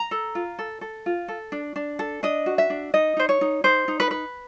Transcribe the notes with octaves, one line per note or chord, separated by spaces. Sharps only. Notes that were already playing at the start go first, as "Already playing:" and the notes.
Already playing: A#5
A4
F4
A4
A4
F4
A4
D4
D4
A4
D4 D#5
F#4
E5
D4
D#4 D#5
D#4 C5
C#5
D#4
D#4 C5
D#4
B4
B4